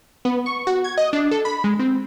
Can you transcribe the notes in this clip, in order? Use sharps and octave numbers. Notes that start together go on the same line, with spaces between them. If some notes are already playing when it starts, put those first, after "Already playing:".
B3
C#6
F#4
G#6
D#5
D4
A4
B5
G#3
C4